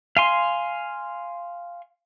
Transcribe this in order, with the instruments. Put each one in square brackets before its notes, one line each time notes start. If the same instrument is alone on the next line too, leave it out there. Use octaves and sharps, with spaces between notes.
[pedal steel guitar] F5 G#5 C6